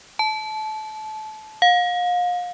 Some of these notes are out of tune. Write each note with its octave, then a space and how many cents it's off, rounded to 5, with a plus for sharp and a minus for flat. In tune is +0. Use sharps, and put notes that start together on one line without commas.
A5 -25
F5 +35